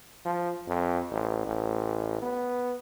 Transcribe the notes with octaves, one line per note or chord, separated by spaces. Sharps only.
F3
F2
A1
A1
B3